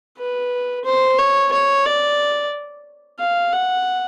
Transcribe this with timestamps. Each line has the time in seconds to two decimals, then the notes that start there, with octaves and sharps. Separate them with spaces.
0.18 B4
0.85 C5
1.18 C#5
1.52 C#5
1.86 D5
3.19 F5
3.52 F#5